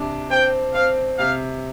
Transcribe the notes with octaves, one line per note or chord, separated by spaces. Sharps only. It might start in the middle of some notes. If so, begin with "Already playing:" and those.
Already playing: C3 D4
C4 G5
C4 F5
C3 F5